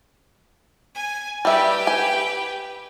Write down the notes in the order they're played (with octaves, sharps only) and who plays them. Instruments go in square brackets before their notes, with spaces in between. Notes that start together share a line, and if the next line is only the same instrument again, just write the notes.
[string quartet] G#5
[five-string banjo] G3 E5 [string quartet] G4 B4 G5
[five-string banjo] G#5